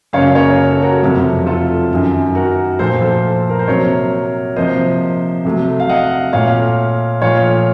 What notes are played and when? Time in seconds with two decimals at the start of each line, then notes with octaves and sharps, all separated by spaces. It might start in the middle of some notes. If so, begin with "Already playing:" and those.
0.13 F#2 C#3 F#3 A#3 C#5 F5
0.35 A#4 C#5
0.57 A#4
0.70 A4
0.82 F#4 A#4
1.02 F2 C3 F#3 A3
1.47 F4 A4
1.91 F#2 D#3 F#3
2.35 F#4 A#4
2.79 A#2 F3 A3 A4 C5
3.02 A4 C5
3.50 A#4
3.59 C5
3.68 C3 F#3 A#3 A#4 C#5
4.56 C3 F3 A#3 C5 D#5
5.45 C3 F#3 A3
5.80 F5
5.89 D#5 F#5
6.33 A#2 A3 C#5 F5
7.22 A#2 F3 A3 C#5 F5